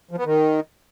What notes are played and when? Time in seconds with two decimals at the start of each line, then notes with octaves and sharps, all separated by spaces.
0.11 F3
0.18 B3
0.25 D#3